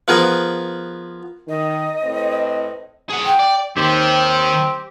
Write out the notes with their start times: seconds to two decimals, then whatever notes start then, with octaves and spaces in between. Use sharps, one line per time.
0.08 F3 B3 G#4 A#4
1.48 D#3 D#5
2.04 A2 C4 B4
3.10 G#4 F#5
3.25 G5
3.39 D5
3.77 D#2 D#3 C4 G4 C5